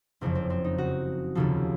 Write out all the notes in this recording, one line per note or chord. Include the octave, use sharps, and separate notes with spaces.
F#1 F2 C#3 F3 C4
C4
C4
D#4
F#4
F1 D#2 C#3 F3 A4